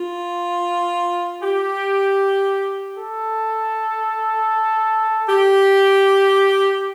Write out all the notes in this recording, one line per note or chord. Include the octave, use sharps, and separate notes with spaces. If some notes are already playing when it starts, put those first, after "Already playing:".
Already playing: F4
G4
A4
G4